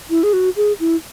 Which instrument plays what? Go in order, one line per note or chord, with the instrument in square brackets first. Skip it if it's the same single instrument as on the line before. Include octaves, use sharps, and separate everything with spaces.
[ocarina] E4
G#4
F#4
G#4
E4